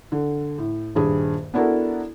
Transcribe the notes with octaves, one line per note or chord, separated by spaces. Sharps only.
D3
A2
D#1 G2 G#4 B5
B3 D4 E4 F#4 A4 A#4